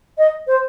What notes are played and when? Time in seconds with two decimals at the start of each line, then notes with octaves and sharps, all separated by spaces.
0.18 D#5
0.47 C5